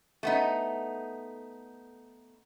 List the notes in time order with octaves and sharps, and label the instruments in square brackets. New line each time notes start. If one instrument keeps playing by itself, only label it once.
[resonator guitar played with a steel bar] A3 B3 D#4